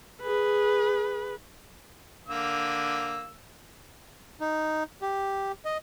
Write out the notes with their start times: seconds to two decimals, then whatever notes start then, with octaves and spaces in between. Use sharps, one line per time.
0.22 G#4 B4
2.28 D3 A#3 E6
4.41 D#4
5.02 G4
5.65 D#5